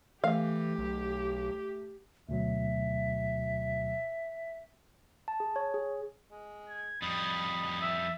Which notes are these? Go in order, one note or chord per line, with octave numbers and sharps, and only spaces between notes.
E3 A3 G4 F5
B1
D2 B2 F#3 E5
A5
G#4
C#5
G#4
G#3
G#6
F2 G3 D#5 B5
E5